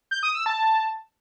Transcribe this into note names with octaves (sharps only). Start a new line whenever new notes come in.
G6
D#6
E6
A5